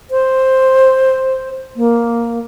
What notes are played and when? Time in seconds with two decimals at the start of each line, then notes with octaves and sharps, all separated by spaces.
0.11 C5
1.76 A#3